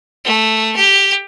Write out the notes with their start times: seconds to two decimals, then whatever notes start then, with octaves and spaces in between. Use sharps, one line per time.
0.25 A3
0.76 G4